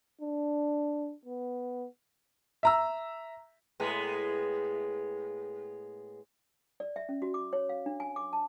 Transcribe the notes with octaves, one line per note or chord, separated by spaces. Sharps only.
D4
B3
E5 A#5 E6
A2 G#3 B3
D5
E5
C#4
F#4
D6
C#5
F5
D4
G#5
D6
A5